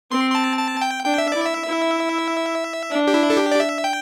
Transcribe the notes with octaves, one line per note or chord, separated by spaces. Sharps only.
C4 C6
C6
A5
A5
G5
D4 G5
E5
E4 D5
E5
E4
D4
G4
E4
A4
G4
D5
E5
G5